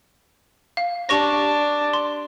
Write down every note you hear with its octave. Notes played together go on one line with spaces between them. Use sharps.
F5
D4 G4 C#6 A#6
C6